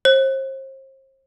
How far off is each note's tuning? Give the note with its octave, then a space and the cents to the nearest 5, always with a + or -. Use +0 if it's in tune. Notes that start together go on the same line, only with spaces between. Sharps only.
C5 +35